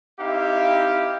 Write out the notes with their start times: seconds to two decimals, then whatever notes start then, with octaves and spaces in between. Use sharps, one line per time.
0.20 C4 D#4 E4 G4 E5 F5